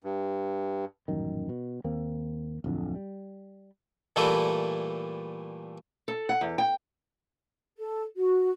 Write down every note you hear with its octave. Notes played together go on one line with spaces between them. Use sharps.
G2
D#1 A1 F#2 D#3
B2
D#2 A#3 C4
D1 F2 D3
G3
A#2 E3 G3 A3 E4 A4
A4
F#5
E2
G5
A4
F#4